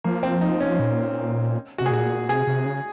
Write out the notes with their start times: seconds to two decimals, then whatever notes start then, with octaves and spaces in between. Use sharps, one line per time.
0.04 F3 A#3
0.23 C4
0.41 D#4
0.60 C#4
0.79 A#2
1.78 C3 F#4
1.86 G#4
1.91 A#2 F#4
2.29 C3 G#4
2.47 C3
2.66 C#3